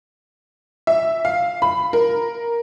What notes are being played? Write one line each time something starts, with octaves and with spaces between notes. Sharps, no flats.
E5
F5
B5
A#4